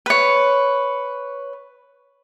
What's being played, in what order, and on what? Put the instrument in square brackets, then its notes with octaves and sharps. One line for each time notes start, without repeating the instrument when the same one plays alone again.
[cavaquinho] B4 C#5